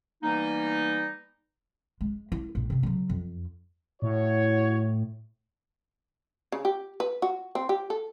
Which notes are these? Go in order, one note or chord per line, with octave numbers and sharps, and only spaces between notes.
E3 G3 A#3 B3 D#4
G#3
E4
A#1 G#2
C3 C#4
C#3 F#3
F2
A2 E4 F#4 C#5
C#3
G4
B4
F#4
C4
G4
A4